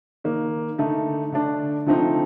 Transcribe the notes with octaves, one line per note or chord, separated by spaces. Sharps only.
D#3 A#3 D#4
D3 A3 D#4
D3 A3 D4
D3 F3 A3 C4 D#4